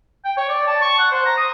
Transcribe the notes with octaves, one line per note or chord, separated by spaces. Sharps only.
G5
C#5
D5
A5
C#6
F#5
C5
A#5
D#6